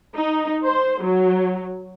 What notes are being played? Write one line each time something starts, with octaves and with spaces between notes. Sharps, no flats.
D#4
C5
F#3